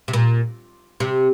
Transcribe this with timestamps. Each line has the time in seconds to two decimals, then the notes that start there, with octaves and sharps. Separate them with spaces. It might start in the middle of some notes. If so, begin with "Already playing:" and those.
0.08 C3
0.13 A#2
1.00 C3